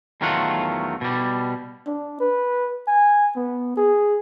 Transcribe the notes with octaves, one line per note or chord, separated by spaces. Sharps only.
E2 D#3 F#3 A3 F4 F#5
B2 G3
D4
B4
G#5
B3
G#4